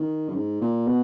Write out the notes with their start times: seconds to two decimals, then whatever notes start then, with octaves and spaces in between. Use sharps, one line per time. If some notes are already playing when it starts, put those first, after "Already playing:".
Already playing: D#3
0.29 F#2
0.36 G#2
0.61 A#2
0.88 B2